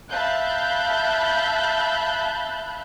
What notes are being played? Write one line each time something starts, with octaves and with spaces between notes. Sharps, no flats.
E5 F5 A5 B5 F#6 G6